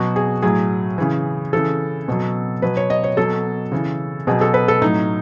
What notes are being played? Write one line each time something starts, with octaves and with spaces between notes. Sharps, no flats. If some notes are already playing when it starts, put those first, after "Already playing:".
Already playing: B2 F#3 F#4
G#4
A2 F#3 G#4
C#3 E3
C#3 E3 A4
B2 F#3
B2 F#3 B4
C#5
D#5
C#5
B2 F#3 A4
C#3 E3
B2 F#3 G#4
A4
B4
A4
A2 F#3 D#4